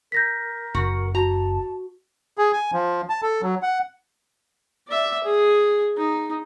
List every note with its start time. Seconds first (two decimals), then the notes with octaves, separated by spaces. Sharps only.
0.12 A#4 G6 A#6 B6
0.75 F#1 F#4
1.15 F#4 A5 A#5
2.38 G#4
2.53 G#5
2.73 F3
3.10 A5
3.23 A4
3.42 F#3
3.63 F#5
4.88 D5 E5
5.24 G#4
5.97 D#4